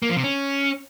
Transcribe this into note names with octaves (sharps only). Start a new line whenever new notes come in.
A#3
F3
C3
C#4